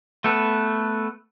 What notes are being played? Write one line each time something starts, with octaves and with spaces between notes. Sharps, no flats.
A3 B3 A4 B4